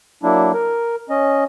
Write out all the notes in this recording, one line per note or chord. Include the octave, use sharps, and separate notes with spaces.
F#3 A#3 D4 E4
A#4
C#4 D#5